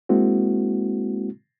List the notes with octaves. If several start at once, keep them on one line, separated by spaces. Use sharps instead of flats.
G#3 A#3 C4 E4 F#4